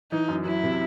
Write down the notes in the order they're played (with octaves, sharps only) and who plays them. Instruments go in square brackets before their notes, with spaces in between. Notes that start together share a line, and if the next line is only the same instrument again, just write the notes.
[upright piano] E3 [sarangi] D#4
[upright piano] F#2
[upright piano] F#3 [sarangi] E4
[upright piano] C3